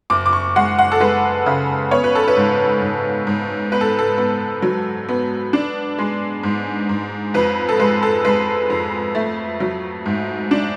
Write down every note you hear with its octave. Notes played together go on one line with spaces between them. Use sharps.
F#1 D6
D6
C#6
G#3 F#5
F#5
A4
G#3 B4
C#3
B3 C#5
B4
A4
B4
G#2
G#2
G#2
B3 B4
A4
A4
B3
F#3
B3
D4
G#3
G#2
G#2
F2 B4
A4
G#3 B4
A4
G#3 B4
F2
A3
F#3
G#2
D4